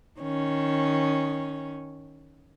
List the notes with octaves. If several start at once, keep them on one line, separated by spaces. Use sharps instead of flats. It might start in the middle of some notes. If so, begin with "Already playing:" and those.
D#3 C#4